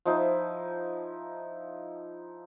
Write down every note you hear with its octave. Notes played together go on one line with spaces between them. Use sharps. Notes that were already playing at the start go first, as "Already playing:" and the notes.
F3 D#4 E4